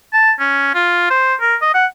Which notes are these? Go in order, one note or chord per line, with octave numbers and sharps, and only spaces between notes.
A5
C#4
F4
C5
A#4
D#5
F#5